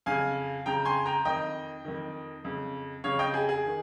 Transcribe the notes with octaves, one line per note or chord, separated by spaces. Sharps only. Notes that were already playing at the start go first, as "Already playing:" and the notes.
F2 C#3 F5 G#5
F2 C#3 G5 A#5
G#5 C6
G5 A#5
F2 D#3 D#5 G5
F2 D#3
F2 C#3
F2 C#3 C#5 F5
D#5 G5
G#4
G#4
D#3